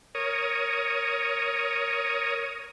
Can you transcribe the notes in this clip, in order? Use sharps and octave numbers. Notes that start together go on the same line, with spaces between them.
A#4 C#5 D#6